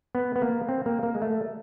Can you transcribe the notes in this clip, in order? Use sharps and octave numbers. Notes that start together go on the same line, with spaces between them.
B3
B3
A#3
C4
A#3
A#3
G#3
A3